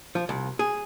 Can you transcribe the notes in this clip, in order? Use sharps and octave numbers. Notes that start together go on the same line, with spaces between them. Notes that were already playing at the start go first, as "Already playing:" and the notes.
F3
C2
G#4